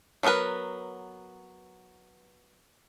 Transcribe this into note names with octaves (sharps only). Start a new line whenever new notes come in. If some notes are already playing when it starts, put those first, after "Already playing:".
F#3 B3 F#4 A#4 B4